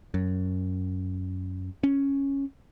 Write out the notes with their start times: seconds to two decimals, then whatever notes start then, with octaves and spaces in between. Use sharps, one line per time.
0.14 F#2
1.84 C#4